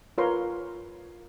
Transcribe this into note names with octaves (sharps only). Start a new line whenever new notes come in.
F4 A#4 B4 C#5 A#5 C6